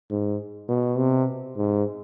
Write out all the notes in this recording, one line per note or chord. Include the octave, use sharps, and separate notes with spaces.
G#2
B2
C3
G#2